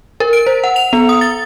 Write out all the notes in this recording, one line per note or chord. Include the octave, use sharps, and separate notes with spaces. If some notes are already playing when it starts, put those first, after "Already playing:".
A#4
D7
C5
F#5
F7
B3
D#6
A6